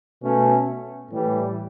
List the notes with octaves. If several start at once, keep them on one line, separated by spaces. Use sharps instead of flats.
B2 A3 C#4
A2 E3 G3